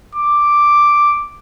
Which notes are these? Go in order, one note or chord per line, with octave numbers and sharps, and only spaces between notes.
D6